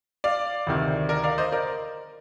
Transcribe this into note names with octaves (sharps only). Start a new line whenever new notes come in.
D5 F5
D2 C3 D#3
A#4 D5
D5 F5
C5 D#5
A#4 D5